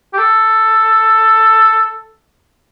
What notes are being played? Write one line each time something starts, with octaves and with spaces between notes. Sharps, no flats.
G4
A4